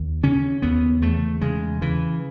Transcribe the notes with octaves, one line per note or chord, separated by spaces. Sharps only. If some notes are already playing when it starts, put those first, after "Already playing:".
Already playing: D#2
C#3 C#4
D#2 B3
E2 A3
C#3 G#3
C#3 E3